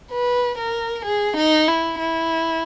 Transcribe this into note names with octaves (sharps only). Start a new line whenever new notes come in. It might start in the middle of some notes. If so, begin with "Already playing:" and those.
B4
A#4
G#4
D#4
E4
E4